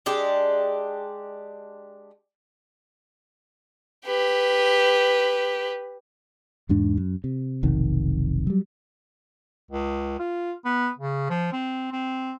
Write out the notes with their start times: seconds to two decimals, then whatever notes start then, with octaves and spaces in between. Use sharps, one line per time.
0.06 G#3 D4 G4
4.06 G4 B4
6.69 E2 G#2 D4
6.97 F#2
7.24 C3
7.63 F1 B1 C3 D#3
8.47 F#3 G3
9.71 C#2
10.19 F4
10.65 B3
10.98 C#3
11.30 F3
11.53 C4
11.92 C4